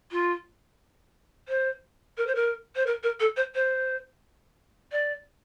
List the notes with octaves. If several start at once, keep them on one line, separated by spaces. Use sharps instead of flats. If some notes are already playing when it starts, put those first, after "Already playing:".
F4
C5
A#4
C5
A#4
C5
A#4
A#4
A4
C5
C5
D5